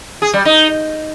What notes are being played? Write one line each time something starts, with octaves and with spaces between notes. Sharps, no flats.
G#4
G3
D#4